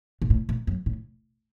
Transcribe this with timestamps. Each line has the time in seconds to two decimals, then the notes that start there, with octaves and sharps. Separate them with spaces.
0.22 A#2
0.30 A2
0.49 A#2
0.67 F#2
0.86 A2